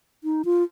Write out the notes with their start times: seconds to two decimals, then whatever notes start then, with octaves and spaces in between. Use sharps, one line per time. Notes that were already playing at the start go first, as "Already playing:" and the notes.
0.24 D#4
0.45 F4